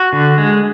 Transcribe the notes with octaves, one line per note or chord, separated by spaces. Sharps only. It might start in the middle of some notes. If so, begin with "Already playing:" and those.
Already playing: F#4
D3
G#3